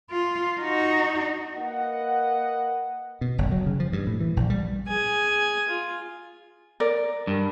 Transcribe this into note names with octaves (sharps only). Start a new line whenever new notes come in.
F4
D#4 F#4
A#3 B4 D#5 F#5
B2
F#1
F#3
C#3
F3
G2
A2
E3
A#1
G3
G#4 G#5
F4
A#4 D5
G2